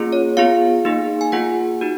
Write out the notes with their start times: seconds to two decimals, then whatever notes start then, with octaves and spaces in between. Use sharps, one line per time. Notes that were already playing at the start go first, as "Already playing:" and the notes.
Already playing: A#3 C#4 F4 G#4
0.13 C#5
0.37 B3 F4 G#4 F5
0.85 A#3 D#4 G#4
1.21 G#5
1.32 A#3 F4 G#4 F#5
1.81 D#4 F#4